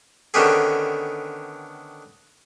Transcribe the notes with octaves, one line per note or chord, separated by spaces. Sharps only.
D3 D#3 B3 C#4 G4 G#4